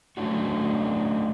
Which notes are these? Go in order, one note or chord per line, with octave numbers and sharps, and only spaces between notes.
F#3 A3 B3 C#4 D4 F#4